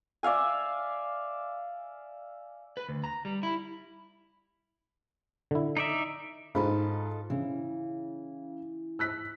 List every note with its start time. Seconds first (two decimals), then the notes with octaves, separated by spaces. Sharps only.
0.23 D5 E5 F5 G#5
2.77 B4
2.89 D2
3.04 A#5
3.25 G3
3.43 E4
5.51 D3 E4
5.77 D#4 D5 E5
6.55 G#2 F4 A4 D#5 B5
7.30 C#3 E3
8.99 E6 F#6 B6